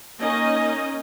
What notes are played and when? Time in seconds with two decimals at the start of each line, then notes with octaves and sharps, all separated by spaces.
0.19 A#3 C#4 D#4 D#5